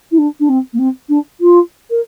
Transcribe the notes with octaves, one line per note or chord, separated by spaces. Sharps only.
E4
D4
D4
C4
A#3
C4
D4
F4
A#4